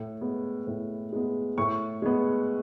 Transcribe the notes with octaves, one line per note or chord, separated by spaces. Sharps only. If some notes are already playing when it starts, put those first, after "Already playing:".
Already playing: A2
G#3 B3
A2
G#3 B3
A2 C#6
G#3 B3